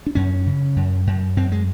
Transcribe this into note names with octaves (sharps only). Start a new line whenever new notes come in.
D4
F#2 C#4
C#3
F#2
F#2
F#2 C4
G#3